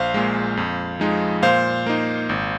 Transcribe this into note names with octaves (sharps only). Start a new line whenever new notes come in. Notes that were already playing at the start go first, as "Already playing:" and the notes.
Already playing: A#1 C5 F5
A#2 G#3
F2
F3 G#3 D#4
A#2 C5 F5
A#3 D#4
G#1